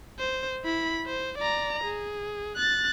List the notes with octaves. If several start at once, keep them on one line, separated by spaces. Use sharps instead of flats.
C5
E4 B5
C5
D5 A#5
G#4
F#6 A6